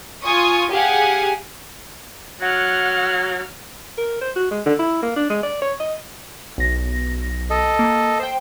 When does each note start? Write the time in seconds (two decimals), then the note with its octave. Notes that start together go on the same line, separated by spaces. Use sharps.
0.23 F4 G#5 C#6 D#6
0.71 G4 G#4 F5 F#5 G#5
2.41 F#3 F#5 F6
3.98 A#4
4.21 C5
4.36 F#4
4.51 G#3
4.66 D3
4.79 E4
5.02 A#3
5.16 D4
5.30 G#3
5.43 D5
5.62 C#5
5.80 D#5
6.58 B1 A#6
7.50 A4 D#5
7.79 A#3
8.20 C5 G5